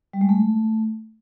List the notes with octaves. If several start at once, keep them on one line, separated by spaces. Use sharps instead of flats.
G3
G#3
A3